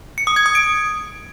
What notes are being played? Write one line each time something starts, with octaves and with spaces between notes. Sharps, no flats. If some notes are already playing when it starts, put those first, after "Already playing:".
C#7
D#6
G#6
D#6
D7